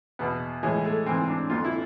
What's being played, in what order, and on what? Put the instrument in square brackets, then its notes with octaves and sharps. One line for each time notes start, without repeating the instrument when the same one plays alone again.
[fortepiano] E2 B2 B3
A2 E3 G#3
A3
G#2 E3 C4
D4
F2 D3 F4
E4